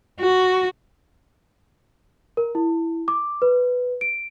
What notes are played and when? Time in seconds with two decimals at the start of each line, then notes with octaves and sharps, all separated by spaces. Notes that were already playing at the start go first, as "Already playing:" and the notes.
0.20 F#4
2.37 A#4
2.55 E4
3.08 D6
3.42 B4
4.01 D7